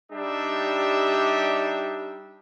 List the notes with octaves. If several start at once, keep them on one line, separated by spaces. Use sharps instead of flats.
G3 D4 D#4 G4 E5